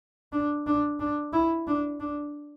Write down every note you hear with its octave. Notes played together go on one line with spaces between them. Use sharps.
D4
D4
D4
E4
D4
D4